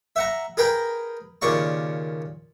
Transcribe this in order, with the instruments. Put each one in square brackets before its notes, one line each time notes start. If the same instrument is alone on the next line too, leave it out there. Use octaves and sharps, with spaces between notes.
[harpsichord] E5 F#5 A#5
G#4 A#4 B4 G5 A#5
D#2 A#2 C#3 D5 C#6